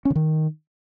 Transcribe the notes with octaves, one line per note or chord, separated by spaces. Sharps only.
C#4
D3
D#3